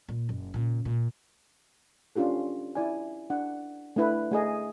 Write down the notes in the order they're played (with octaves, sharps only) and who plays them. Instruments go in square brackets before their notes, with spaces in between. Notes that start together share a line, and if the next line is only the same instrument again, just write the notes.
[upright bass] A#2
F#1
A#2 C#3
A#2
[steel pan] C#4 D4 F4 G4 A4
E4 D5 G#5
D4 F#5
A3 D4 E4 B4
A3 G#4 D#5